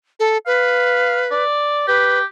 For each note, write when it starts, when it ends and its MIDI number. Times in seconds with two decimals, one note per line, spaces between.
0.20 0.38 69
0.46 1.44 71
0.46 1.24 77
1.31 1.85 74
1.88 2.24 67
1.88 2.20 71